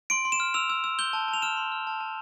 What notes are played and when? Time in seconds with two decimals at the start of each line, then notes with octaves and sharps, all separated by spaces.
0.10 C6 D7
0.25 C6
0.32 E7
0.40 F6
0.54 E6 F7
0.70 E6
0.84 E6
0.99 G6 G7
1.13 A5
1.28 A5
1.33 F7
1.42 F6 E7
1.57 C6
1.72 F6
1.87 A5
2.01 A5